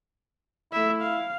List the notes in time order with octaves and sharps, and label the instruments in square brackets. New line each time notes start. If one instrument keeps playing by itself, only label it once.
[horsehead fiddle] A3 E5 [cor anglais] E4
[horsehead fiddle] F5